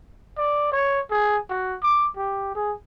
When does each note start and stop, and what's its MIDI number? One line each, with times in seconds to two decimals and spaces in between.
0.37 0.69 74
0.72 1.00 73
1.11 1.38 68
1.50 1.76 66
1.83 2.09 86
2.17 2.53 67
2.55 2.73 68